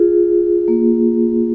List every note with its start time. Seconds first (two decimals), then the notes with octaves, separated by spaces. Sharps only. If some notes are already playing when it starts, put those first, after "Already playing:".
Already playing: F4 G#4
0.68 A#3